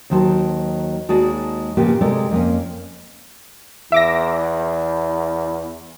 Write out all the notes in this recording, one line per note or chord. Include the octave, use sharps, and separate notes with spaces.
D#2 D#3 F#3 C5 A5
D#2 G#3 F#4 G#4 D5 A5
A#2 C#3 F3 A#3 B3 G4
C3 G#3 A4 A#4 D5
F2 A#3 C#4
E2 E5 D6 A#6